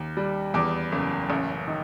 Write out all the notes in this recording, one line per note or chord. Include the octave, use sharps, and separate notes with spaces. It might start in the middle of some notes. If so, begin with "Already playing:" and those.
Already playing: D#2
G3
E2 D6
F#1
A1
D#3